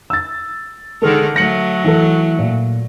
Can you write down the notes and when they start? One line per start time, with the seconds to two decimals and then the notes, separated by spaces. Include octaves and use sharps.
0.10 E6 A6
1.02 D3 D#3 G#3 A4 A#4
1.36 F#3 A3 A#6 C#7 F#7
1.84 E3 A4
2.39 A#2